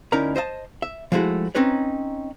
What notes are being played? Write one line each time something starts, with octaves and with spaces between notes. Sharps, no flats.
D2 C#4 D#4 E4 A#4 A#5
C5 D#5 E5 A5
E5
F3 G#3 A3 E4 F#4
C4 C#4 D#4 B4 C#5